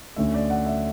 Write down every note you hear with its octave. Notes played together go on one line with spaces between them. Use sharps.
D2 D3 A3 C#4 E5
D5
F#5
E5